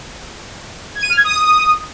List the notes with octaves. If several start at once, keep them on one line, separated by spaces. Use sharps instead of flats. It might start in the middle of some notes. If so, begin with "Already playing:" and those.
G#6
D#7
F6
G#6
D#6